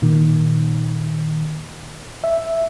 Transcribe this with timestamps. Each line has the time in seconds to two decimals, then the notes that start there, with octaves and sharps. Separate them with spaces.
0.02 A#2 D#3
2.24 E5